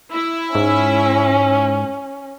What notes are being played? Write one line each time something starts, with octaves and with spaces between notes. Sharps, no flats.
E4 E5
G#2 C#4